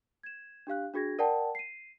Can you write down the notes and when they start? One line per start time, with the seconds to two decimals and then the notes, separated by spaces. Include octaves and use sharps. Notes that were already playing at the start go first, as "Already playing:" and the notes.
0.23 G#6 E7
0.67 D4 G4 F5 F#6
0.94 D4 F#4 G#4 G#6 A#6
1.19 A#4 D5 F#5 G5 A5
1.55 C7 D#7